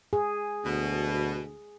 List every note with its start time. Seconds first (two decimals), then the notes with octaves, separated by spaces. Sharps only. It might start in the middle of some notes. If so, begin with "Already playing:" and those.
0.13 G#4
0.65 D2 B2